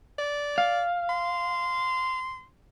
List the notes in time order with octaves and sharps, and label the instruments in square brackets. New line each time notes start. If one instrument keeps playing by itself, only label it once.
[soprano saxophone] D5
[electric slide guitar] F5
[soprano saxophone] C6